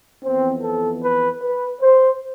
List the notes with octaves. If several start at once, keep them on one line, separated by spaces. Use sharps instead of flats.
F2 E3 B3 C4
A4
B4
B4
C5